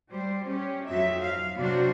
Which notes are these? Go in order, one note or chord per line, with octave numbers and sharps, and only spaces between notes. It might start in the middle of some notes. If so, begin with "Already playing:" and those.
G3 C5
C#4 G4
F2 F#3 D#4 E5
F5
C3 F#3 D4 F#4 C5